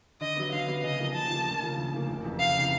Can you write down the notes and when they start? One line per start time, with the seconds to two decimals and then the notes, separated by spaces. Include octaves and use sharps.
0.21 D3 D#5
0.37 F#3 B3
0.53 D3 F5
0.68 F#3 B3
0.84 C#3 D#5
1.00 F3 A#3
1.15 C#3 A5
1.30 F3
1.35 A#3
1.46 D2
1.62 C#3 F3 A#3
1.78 D2
1.93 C#3 F3 A#3
2.08 F#1
2.25 F2 C3 E3
2.40 F#1 F5
2.58 C3 E3